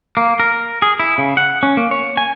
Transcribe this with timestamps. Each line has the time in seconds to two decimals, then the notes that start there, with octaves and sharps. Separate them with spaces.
0.17 A#3
0.40 A#4
0.82 G#4
1.00 E4
1.18 C#3
1.37 F#5
1.63 C#4
1.77 A#3
1.91 C#5
2.17 G#5